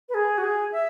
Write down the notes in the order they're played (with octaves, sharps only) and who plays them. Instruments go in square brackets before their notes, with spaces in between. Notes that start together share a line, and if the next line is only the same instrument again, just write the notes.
[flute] B4
G#4
F#4
G#4
E5